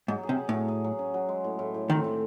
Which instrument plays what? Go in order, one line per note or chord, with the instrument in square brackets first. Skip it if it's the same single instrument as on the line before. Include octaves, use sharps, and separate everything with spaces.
[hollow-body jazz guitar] G#2 [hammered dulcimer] F#3
[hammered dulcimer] G#4
[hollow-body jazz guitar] C3
[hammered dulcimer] G#4
[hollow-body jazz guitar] A2 [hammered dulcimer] F#3
[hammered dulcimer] G#4
F#3
C#4
F#3
G#3
A2
A2
A2
[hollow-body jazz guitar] D#3 [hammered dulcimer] C4
[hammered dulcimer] A2